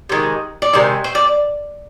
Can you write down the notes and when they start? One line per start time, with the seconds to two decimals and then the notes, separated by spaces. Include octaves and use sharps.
0.09 C3 D#3 G#3
0.62 D5
0.73 C3 D#3 G#3 C5
1.04 C5
1.15 D5